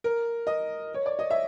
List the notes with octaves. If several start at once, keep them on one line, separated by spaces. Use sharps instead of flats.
A#4
D#5
C#5
D5
D#5
E5